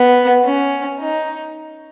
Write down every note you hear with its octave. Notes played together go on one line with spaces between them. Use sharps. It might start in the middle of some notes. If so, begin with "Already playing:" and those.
Already playing: B3
C#4
D#4